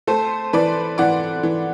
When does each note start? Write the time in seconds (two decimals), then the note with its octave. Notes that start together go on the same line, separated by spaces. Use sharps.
0.07 A3 A4 C5
0.53 E3 B4 D5
0.98 E3 D5 F#5
1.43 E3